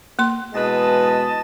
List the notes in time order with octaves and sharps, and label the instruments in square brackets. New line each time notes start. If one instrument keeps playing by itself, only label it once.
[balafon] A#3 C6
[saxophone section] E2 B3 B4 [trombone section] B2 G#3 [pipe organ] D#5 A5 A6